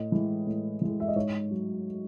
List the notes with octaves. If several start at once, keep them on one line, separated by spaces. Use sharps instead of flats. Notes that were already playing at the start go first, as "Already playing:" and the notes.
Already playing: A2 D#5
E3 G#3
A2
E3 G#3
E5
D#5
G#2 C#5
F#3